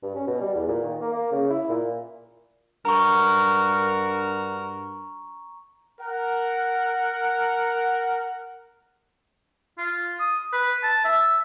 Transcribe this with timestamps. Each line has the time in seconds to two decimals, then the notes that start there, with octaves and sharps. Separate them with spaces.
0.02 G2
0.16 C#4
0.27 B2
0.41 G3
0.54 E2
0.68 A#2
0.83 D#3
1.01 A#3
1.13 A#3
1.32 C#3
1.50 E4
1.69 A#2
2.85 G2 F#4 A#4 A#5 C#6
6.00 A#4 F#5
9.78 F4
10.20 D#6
10.53 B4
10.83 A5
11.04 E5